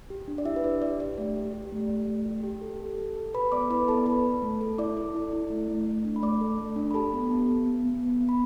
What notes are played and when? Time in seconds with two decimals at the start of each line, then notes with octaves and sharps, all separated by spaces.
0.10 G4
0.28 D4
0.38 D5
0.45 E4 G4 E5
0.56 B4
0.64 D4 D5
0.82 G4 D5
1.00 G4 D5
1.17 A3 D5
1.36 G4
1.53 G4
1.72 A3
1.90 A3
2.08 A3
2.26 G4
2.43 G4
2.61 A4
2.80 A4
2.98 A4
3.16 A4
3.34 A4 B4 B5
3.52 B3 D5 D6
3.70 E4 B4 B5
3.88 B3 A4 A5
4.06 A4 B4 B5
4.24 A4
4.42 A3
4.61 A4
4.78 E4 D5 D6
4.97 A4
5.15 E4
5.33 E4
5.50 A3
5.68 A3
5.87 A3
6.05 D4
6.16 B5
6.23 A3 D5 D6
6.41 A4
6.59 A3
6.76 D4
6.91 B5
6.94 G4 A4 A5
7.13 B3
7.31 B3
7.49 B3
7.66 B3
7.85 B3
8.03 B3
8.21 B3
8.29 B5